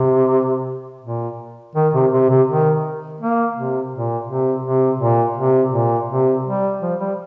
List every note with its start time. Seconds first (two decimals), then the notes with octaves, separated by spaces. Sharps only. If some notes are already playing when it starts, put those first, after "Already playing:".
Already playing: C3
1.03 A#2
1.75 D#3
1.94 C3
2.12 C3
2.30 C3
2.48 D#3
3.21 A#3
3.56 C3
3.93 A#2
4.28 C3
4.65 C3
5.00 A#2
5.37 C3
5.73 A#2
6.09 C3
6.46 G3
6.82 F3
7.00 G3